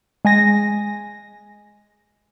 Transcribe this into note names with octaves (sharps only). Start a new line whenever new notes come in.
G#3 G#5 A#6